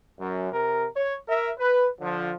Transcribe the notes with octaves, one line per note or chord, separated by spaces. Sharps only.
F#2
C3 A#4
C#5
A#4 E5
B4
D3 F3